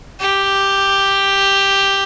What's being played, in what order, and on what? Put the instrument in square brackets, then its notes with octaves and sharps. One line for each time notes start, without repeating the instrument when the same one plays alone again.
[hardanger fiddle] G4